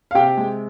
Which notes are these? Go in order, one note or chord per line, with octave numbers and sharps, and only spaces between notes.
F5
C3 G4 G5
G#3